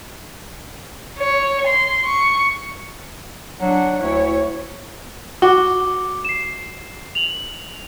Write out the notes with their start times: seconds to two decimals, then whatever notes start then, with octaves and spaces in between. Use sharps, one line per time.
1.19 C#5
1.67 C6
2.06 C#6
3.61 F#3 D4 F#5
4.03 D2 E4 C#5
5.42 F#4 D6 G7
6.25 C7 E7
7.15 F7 F#7